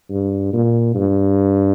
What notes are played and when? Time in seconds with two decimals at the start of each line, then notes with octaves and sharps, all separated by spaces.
0.10 G2
0.53 A#2
0.95 G2